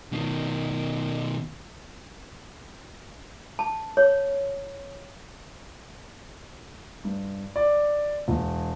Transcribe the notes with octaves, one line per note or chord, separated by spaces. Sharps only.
B2 D#3
A5
C#5
G2
D5
E1